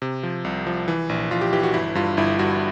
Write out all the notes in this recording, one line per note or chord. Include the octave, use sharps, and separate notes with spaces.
C3
F3
C2
F3
E3
A#1
A#1 F4
G4
E3 G4
F#4
G1 E4
G2 F4
G1 E4
G2 F#4